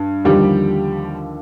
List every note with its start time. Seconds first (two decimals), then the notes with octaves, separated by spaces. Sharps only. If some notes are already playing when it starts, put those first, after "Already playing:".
Already playing: G2
0.25 D#2 D3 F3 G3 G4